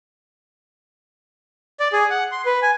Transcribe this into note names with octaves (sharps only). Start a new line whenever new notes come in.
D5
G#4
F#5
C6
B4
G#5